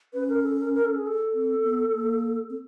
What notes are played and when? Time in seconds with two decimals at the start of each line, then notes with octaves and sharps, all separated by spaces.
0.13 C#4 B4
0.29 A#4
0.44 A4
0.59 A#4
0.74 A#4
0.85 A4
0.96 G#4
1.07 A4
1.34 C4
1.64 B3
1.94 A#3
2.50 C4